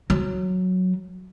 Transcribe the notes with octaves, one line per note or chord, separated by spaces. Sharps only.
F#3